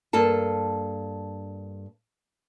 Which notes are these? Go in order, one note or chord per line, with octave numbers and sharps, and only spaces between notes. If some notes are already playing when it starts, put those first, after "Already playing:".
G2 A#3 A4 A5